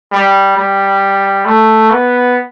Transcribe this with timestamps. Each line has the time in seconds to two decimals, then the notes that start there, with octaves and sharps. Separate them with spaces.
0.12 G3
0.57 G3
1.45 A3
1.91 B3